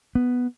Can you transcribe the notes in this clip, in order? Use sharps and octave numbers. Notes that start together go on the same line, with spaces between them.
B3